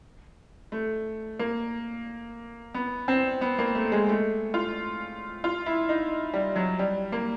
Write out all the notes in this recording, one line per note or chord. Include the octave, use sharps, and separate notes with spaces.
A3
A#3
B3
C4
B3
A#3
A3
G#3
A3
F4
F4
E4
D#4
G3
F#3
G3
A#3